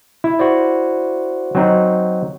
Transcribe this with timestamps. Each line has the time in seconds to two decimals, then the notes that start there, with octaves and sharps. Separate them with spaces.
0.24 E4
0.39 F#4 C5 D5
1.55 F#3 C4 D#4